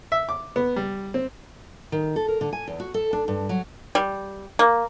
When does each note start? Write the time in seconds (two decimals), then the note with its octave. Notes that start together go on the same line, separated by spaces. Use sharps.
0.12 E5
0.29 D6
0.56 B3
0.76 G3
1.14 C4
1.92 D#3
2.16 A4
2.28 A#4
2.41 D3
2.53 G#5
2.68 E2
2.80 F#4
2.94 A4
3.13 D4
3.28 G2
3.49 F#3
3.95 G3
4.59 A#3